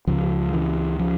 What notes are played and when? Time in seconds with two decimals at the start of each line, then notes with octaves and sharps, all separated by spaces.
0.07 C#2 C#3 F3
0.53 E3
0.99 F3